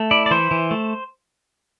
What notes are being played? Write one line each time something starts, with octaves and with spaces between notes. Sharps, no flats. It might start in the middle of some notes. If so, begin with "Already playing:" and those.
Already playing: A3
E4 D5
D5
E3 C5
E3
A3